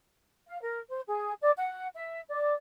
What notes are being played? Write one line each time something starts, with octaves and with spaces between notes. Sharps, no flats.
F5
A#4
C5
G#4
D5
F#5
E5
D5